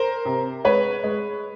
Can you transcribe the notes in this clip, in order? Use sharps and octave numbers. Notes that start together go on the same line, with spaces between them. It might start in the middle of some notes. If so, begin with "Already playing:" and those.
Already playing: A#4 C5
C3
G#3 B4 C#5
G#3